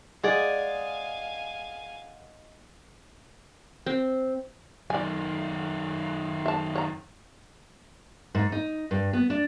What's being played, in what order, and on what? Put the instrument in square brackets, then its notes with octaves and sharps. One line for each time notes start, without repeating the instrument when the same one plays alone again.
[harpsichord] G#3 [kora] G#4 D5 [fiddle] F5 G#5 [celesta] F#5
[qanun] C4
[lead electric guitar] F#2 D#3 [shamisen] D5 G#5
[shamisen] E5 A5
C#5 A#5
[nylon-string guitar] G#2
D#4
G2
B3
D4